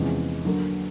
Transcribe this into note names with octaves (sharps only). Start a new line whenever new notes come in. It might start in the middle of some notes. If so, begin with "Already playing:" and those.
Already playing: E2 C3 F3 G#3 C#4
D3 F#3 A#3